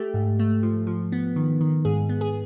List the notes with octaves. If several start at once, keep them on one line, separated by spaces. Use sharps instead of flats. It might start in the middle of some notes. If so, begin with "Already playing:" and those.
Already playing: A3 G4
G#2
A3
F3
F3
B3
D#3
D#3
G#2 G#4
B3
G#4